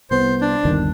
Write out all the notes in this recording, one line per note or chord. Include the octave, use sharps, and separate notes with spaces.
C2 B3 C5
D4
G1 D#2 D#3